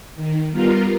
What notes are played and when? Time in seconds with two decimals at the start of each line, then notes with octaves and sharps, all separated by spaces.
0.16 D#3
0.51 G3 B3 F4 A#4 F5